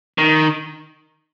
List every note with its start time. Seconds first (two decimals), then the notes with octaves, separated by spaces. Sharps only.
0.18 D#3